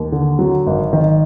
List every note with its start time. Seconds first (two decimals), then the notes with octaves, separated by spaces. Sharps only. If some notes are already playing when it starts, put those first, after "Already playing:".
Already playing: D#2
0.12 D3
0.39 F#3
0.67 G#1
0.93 D#3